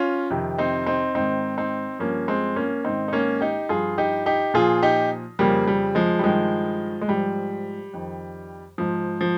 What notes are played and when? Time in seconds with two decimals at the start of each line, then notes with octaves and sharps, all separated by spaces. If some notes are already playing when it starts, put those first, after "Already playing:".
Already playing: C#4 F4
0.30 F2 C3 D#3
0.58 C4 D#4
0.86 C4 D#4
1.15 G#2 D#3 C4 D#4
1.57 C4 D#4
1.99 G2 F3 A#3 C#4
2.28 G#3 C4
2.56 A#3 C#4
2.84 G#2 D#3 C4 D#4
3.08 D#4
3.13 A#3 C#4
3.41 D#4 G4
3.69 G2 F3 F4 G#4
3.98 D#4 G4
4.26 D#4 G4
4.54 A#2 F3 F4 G#4
4.83 D#4 G4
5.39 F2 C#3 F3 G3 A#3
5.67 G3
5.95 F3 G#3
6.19 G3
6.23 G2 D#3 F3 G#3
7.02 G#3
7.08 G#2 F3 G3
7.93 F2 D#3
8.78 G#2 F3
9.21 F3